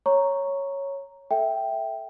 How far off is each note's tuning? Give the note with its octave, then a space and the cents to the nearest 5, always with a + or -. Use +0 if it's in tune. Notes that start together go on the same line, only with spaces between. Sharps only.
C#5 +0 A#5 +0 C#6 +0
A4 +0 E5 +0 G5 +0